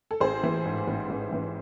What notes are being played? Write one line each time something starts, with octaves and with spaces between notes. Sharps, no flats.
A4
A1 G#4 C5
E3
G#2
A1
A1
E3